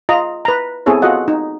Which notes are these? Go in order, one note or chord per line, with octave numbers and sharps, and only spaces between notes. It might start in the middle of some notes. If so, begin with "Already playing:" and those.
F4 D#5 A#5
B4 A#5
B3 C4 E4 G#4 A4 C#5
F4 F#4 A4 D#5 F#5
D#4